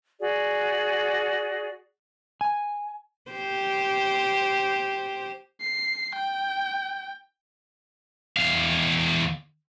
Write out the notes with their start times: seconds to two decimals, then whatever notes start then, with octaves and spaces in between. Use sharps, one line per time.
0.19 F#4 G#4 D5
2.41 G#5
3.31 G4 C5
5.61 C7
6.16 G5
8.37 E2 F5